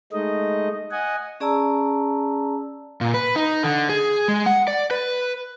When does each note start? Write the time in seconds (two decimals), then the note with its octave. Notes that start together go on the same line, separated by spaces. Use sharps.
0.12 G#3 A3 D#4 D#5
0.91 D#5 F#5 G#5
1.40 C#4 G#4 D5 A5 A#5 E6
3.01 A#2
3.14 B4
3.36 D#4
3.63 D3
3.89 G#4
4.28 G#3
4.46 F#5
4.68 D5
4.91 B4